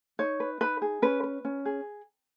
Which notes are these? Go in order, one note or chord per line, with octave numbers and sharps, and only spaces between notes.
D#4 C#5
B4
D#4 B4
G#4
C#4 B4
B4
C#4
G#4